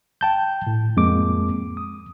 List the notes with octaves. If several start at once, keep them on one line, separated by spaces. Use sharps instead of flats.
G5 A5 G6
A2
F2 G#3 A#3 D6
D#6